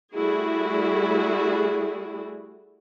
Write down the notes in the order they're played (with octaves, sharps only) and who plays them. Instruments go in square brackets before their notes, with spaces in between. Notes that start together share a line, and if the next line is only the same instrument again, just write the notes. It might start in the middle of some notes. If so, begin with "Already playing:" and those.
[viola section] G3 A3 E4 F#4 G#4